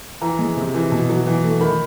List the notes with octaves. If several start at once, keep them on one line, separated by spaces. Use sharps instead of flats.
E3 A#5
G#3
C3
E3
B2
F#3
E3
A3
D#3 B5